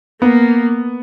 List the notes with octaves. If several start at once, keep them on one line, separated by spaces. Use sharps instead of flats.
A#3 B3